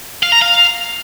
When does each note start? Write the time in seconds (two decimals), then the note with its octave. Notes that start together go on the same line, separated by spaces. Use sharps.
0.23 F5
0.32 A#5
0.42 F5